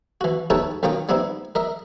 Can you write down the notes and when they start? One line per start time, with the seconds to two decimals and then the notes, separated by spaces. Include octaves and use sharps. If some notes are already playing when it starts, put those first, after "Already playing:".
0.21 E3 F#4
0.50 D#4 E4 G4 A4 B4 C#5
0.83 B1 D#3 C#4 F4 G5 D#6
1.09 G3 B3 C4 D#4 E4
1.55 A#4 D#5 E5